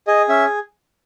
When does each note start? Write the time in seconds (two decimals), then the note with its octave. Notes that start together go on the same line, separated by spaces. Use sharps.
0.07 G#4 D#5
0.29 C#4 E5